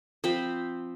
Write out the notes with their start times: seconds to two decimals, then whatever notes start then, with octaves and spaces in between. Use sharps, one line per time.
0.24 F3 C4 C5 B5